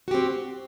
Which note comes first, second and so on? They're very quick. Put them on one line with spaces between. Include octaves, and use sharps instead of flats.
F#4 G4 C4